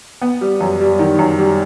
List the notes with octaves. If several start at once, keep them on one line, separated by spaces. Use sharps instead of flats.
B3
G3
F#2
G3
D#3
F#2
G3